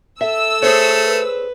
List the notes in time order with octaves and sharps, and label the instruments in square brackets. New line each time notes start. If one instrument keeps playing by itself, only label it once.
[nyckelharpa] A4 [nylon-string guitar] E5 [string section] E6
[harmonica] A3 [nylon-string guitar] G#4 C5 C#5
[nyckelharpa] B4